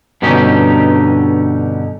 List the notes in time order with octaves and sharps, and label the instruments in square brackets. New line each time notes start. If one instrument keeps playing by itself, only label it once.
[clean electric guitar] G2 B2 D3 C#4 D#4 G4